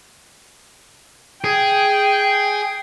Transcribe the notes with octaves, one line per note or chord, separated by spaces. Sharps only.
G#4 G5